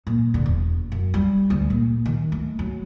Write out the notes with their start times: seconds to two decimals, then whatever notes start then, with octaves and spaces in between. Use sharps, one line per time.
0.07 A#2
0.34 D3
0.46 E1
0.92 F#2
1.14 G3
1.50 D2
1.70 A#2
2.06 D#3
2.32 A3
2.59 F#3